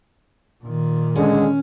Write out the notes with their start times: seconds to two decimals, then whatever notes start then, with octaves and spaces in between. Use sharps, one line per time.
0.65 A#2 D#3
1.16 D3 G#3 C#4 G#4